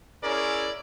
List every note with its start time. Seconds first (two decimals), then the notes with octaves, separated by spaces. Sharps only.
0.23 C#4 E4 G#4 A#4 D5